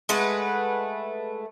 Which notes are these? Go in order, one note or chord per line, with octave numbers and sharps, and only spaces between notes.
G#3 A3 B4 F#5